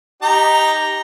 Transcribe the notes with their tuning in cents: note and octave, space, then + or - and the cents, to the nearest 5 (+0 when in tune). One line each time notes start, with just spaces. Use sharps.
D#4 +0 G4 +0 A#5 +0